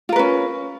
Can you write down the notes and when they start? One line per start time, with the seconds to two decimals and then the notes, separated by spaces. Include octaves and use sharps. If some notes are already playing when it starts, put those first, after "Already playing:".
0.09 F4
0.12 A#4
0.16 B4
0.19 C#4